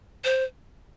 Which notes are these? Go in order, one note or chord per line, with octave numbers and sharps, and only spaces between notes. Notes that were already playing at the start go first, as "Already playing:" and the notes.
C5